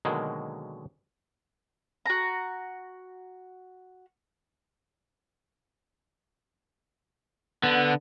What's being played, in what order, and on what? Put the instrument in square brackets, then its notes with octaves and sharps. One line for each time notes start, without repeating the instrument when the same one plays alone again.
[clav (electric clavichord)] B2 D3 D#3 F#3 G#3 A#3
[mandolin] F#4 A#5
[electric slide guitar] D3 [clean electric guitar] B3